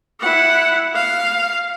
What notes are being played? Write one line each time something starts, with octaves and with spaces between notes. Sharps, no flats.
E4 F#5
F5